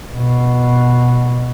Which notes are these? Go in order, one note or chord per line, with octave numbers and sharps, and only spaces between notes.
B2